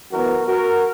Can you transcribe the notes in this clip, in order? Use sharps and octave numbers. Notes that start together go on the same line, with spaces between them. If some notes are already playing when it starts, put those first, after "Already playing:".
F#2 E3 B3 F#4 A#4
F#4 A#4